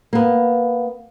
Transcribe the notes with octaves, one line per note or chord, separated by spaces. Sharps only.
A#3 B3